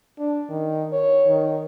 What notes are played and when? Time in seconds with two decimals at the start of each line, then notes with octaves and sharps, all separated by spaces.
0.19 D4
0.49 D#3
0.93 C#5
1.28 D#3